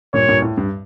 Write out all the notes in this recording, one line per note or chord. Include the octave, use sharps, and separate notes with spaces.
G2 A#2 C#5
G2 A#2
A2
G2